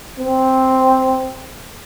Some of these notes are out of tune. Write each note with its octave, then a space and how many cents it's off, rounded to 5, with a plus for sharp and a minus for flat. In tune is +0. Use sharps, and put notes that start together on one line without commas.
C4 +0